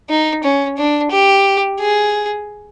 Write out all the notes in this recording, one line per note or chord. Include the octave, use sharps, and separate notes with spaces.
D#4
C#4
D4
G4
G#4